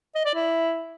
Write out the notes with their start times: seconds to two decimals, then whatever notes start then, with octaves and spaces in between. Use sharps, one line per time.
0.15 D#5
0.25 D5
0.35 E4